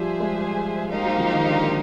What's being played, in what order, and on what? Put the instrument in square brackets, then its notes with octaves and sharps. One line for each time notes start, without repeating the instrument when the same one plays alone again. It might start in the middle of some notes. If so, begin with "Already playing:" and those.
Already playing: [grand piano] F3 G3 [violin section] G#4 C5 E5 G#5
[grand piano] G#3
G3
[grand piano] G#3 [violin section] A#3 D#4 G4 C5 F5
[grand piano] F#3
F3
D#3
D3